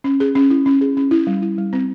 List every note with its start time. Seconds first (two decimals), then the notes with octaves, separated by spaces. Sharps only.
0.04 C#4
0.20 G#4
0.35 C#4
0.50 E4
0.66 C#4
0.81 G#4
0.97 C#4
1.11 E4
1.27 G3
1.42 E4
1.58 G3
1.73 C4